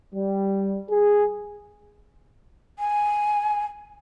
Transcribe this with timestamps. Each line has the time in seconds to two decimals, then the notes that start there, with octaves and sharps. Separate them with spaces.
0.14 G3
0.89 G#4
2.79 G#5